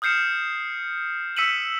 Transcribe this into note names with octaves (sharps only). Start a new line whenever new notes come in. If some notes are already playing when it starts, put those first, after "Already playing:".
D#6 F6 G6 C7 C#7 E7
E6 B6 C#7 D#7 E7 F#7